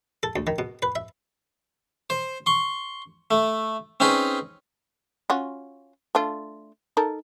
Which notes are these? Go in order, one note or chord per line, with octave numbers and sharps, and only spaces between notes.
A4
D2
D#3
B2
B4
E5
C5
C6 C#6
A3
C4 C#4 D#4 G#4 B4
C#4 F4 F#4
A3 D4 F4
D#4 A4 A#4